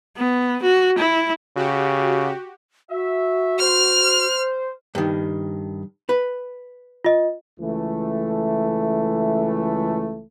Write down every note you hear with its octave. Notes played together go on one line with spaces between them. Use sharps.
B3
F#4
E4
C#3 F#4 G4
F#4 E5
C5 F6
G2 D#3
B4
F4 D#5
C#2 E3 A3